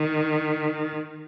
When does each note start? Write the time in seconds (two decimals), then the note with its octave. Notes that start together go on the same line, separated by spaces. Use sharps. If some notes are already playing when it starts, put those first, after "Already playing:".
Already playing: D#3